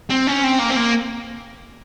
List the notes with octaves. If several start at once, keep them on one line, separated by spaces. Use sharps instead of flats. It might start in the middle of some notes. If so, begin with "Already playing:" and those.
C4
C#4
C4
A#3
C4
A#3